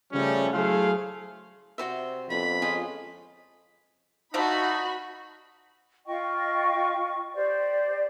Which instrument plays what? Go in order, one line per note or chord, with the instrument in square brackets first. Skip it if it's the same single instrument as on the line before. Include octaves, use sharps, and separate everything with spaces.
[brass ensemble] C#3 F3 G3 A3 C#4
F#3 A3 E4 G#4 C5 F5
[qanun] C3 D5 G5 [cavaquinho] F#4 C5 E5
[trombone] F2 [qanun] B3 D4 [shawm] B5
[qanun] G#3 C#4 F5 [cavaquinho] F4 G#4 C5
[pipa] D3 F3 A3 [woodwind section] D#4 [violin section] F#4 B5
[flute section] F4 D#5 G5 C#6
G4 C5 D5